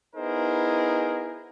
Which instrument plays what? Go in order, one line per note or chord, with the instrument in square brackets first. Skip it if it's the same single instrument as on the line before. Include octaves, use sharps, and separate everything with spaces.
[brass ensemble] B3 D#4 E4 G#4 A#4 C5